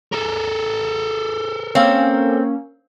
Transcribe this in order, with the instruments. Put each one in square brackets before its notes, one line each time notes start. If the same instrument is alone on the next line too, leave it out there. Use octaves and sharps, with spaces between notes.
[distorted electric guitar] A4 A#4
[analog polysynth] A#3 C#4 [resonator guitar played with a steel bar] C4 [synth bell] C#5 F5 E6